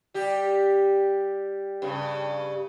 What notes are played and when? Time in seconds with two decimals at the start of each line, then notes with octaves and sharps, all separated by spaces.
0.14 G3 G4
1.82 G2 C#3